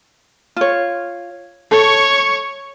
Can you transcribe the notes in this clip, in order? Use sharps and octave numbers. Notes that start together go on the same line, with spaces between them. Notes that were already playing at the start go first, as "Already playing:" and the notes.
F4 C#5
A4 C#5 C#6